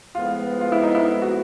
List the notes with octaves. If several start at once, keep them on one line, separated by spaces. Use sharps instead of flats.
A2 F3 G#3 B3 F4
F4
E4
D#4
E4
F#4